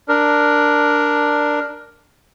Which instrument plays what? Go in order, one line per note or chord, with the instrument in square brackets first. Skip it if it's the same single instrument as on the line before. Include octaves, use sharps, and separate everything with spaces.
[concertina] D4 A#4